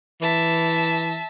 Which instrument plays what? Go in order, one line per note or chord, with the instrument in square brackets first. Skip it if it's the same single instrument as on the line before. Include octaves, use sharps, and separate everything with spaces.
[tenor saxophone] E3 [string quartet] E5 A5